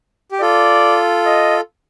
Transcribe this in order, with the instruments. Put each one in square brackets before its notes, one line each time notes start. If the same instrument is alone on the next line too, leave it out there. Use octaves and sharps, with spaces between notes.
[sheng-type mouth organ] G4
[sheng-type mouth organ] F4 A4 [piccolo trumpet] D5
[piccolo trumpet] D#5